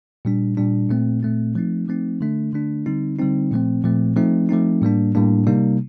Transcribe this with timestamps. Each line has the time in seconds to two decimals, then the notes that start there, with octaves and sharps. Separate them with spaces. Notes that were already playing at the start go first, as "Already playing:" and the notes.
0.25 A#2 G3 D4
0.57 A#2 G3 D4
0.90 A#2 A3 C4
1.23 A#2 A3 C4
1.55 F3 A3 C4 D#4
1.88 F3 A3 C4 D#4
2.21 D3 A3 D4
2.53 D3 A3 D4
2.86 D3 G3 C4 D#4
3.19 D3 G3 C4 D#4
3.51 A#2 F3 A3 C4
3.84 A#2 F3 A3 C4
4.16 F3 A3 C4 D#4
4.49 F3 A3 C4 D#4
4.82 A2 G3 A#3 D4
5.15 A2 G3 A#3 D4
5.47 C3 G3 A#3 D#4